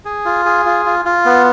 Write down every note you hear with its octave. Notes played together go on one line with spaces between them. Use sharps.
G#4
F4
G#4
F4
F4
F4
B3